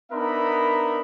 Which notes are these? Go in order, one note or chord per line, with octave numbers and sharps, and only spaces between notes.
B3 D4 D#4 A#4 E5 B5